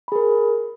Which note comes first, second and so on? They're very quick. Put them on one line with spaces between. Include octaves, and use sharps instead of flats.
B5 G#4 A#4